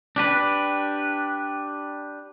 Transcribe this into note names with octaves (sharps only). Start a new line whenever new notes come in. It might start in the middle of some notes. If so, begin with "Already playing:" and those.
D4 G4 B4